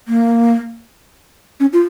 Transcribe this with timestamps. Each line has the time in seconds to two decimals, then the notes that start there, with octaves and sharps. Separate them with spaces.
0.08 A#3
1.60 C#4
1.73 F4